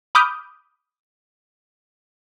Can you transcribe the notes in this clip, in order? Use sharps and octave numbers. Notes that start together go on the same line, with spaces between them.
B5 D6 D#6 F6 G6